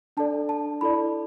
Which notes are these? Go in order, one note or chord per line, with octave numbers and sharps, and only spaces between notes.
D4 A4 D5 A5
A5
E4 A4 D5 B5